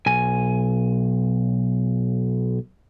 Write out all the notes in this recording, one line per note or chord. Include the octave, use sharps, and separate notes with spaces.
B1 G#5